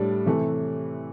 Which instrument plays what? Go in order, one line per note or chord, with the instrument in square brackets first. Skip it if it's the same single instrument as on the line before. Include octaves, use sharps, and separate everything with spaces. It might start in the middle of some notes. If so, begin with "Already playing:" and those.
Already playing: [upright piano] A2 G3 D4
C3 E3 A3